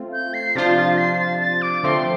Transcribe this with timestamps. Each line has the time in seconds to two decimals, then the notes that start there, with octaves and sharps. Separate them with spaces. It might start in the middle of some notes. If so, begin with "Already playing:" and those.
Already playing: A3 C4 F4
0.13 G6
0.34 C7
0.55 C3 F3 D4 F4 C5 A6
0.76 A6
0.98 C7
1.20 A6
1.41 A6
1.62 D6
1.83 D3 F3 A3 C4 C6